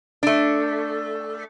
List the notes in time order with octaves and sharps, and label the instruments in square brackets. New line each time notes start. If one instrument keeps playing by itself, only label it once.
[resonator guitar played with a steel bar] A3 D4